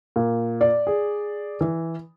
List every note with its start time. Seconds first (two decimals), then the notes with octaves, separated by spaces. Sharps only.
0.16 A#2
0.61 D5
0.87 G#4
1.61 E3